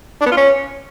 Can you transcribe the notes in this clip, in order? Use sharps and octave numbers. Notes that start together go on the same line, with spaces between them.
D4
B3
F4
C#4